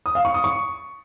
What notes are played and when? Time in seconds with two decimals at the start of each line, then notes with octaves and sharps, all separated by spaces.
0.06 D#6
0.15 F5
0.25 C#6
0.34 D#6
0.44 C#6